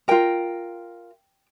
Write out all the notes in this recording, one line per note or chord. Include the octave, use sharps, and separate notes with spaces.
F4 A#4 G5